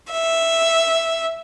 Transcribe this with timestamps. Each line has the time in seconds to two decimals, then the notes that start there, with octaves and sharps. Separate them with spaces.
0.11 E5